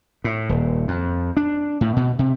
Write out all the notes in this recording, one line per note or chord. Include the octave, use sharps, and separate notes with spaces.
A2
D#1
F2
D4
A2
B2
C3